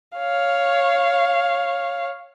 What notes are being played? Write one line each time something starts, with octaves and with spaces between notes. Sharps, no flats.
C#5 F5